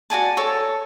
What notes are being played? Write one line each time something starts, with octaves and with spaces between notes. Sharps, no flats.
F#4 D5 G#5 A5
A4 C#5 A5